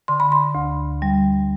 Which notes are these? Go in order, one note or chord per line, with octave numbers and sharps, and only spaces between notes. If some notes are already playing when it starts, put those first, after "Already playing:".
D3 C6
B5
C6
D2
G3